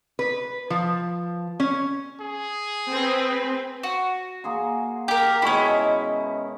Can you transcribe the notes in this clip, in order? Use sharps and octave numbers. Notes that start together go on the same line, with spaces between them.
B4
F3
C#4
G#4
C4 B4
F#4
A#3 G#4 C6
G4 A#4
B2 D#3 G#3 C#4 E4